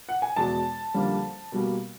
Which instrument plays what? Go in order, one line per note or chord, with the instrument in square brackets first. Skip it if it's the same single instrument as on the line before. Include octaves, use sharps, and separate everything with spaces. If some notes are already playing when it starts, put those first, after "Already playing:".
[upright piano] F#5
G#5
E2 B2 G#3 A5
F2 D3 G3 A#3
B2 G3 A#3